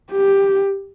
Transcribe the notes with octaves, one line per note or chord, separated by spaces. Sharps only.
G4